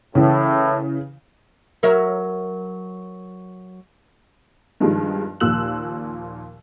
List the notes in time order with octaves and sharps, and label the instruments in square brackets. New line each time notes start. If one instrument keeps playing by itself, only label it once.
[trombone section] A2 [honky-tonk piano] C#3 E3
[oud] F#3 A#4 E5
[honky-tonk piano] G2 D#3 F3 G3 G#3
D#2 A#2 F3 E6 F#6 F#7